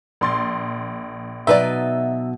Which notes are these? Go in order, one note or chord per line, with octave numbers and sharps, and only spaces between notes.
A#1 C6 A6
B2 F#3 D#4 B4 D5 E5